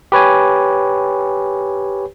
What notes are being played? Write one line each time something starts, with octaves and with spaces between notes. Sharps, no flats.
G4 B4 C#5 G#5